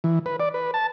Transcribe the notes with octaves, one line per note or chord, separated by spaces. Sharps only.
E3
B4
D5
B4
A5